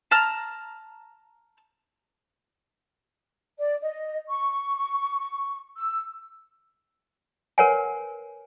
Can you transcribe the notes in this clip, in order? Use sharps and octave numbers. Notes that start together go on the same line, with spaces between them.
A5 A#5 F6
D5
D#5
C#6
E6
A#4 B4 C#5 F#5 G#5